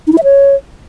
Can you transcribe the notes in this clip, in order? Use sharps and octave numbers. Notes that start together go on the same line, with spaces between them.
D#4
E4
E5
C#5